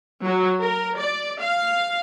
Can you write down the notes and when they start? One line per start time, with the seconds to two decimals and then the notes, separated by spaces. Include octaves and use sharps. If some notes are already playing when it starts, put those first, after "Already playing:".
0.23 F#3
0.61 A#4
0.97 D5
1.40 F5